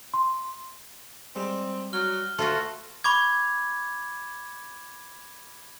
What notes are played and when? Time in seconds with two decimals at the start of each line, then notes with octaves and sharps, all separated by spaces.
0.14 C6
1.36 G3 G#3 C4 G4
1.93 F#3 F6 G7
2.38 D2 A3 F4 F#4 C6
3.04 B5 C#6 D6 G#6